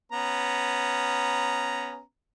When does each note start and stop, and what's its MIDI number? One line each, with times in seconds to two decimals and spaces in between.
0.12 2.00 59
0.12 2.00 61
0.12 2.00 82